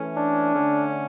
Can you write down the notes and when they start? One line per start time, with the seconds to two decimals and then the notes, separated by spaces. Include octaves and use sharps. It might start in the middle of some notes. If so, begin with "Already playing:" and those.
Already playing: E3 A3 C#4
0.16 D4
0.54 D3 A3 C#4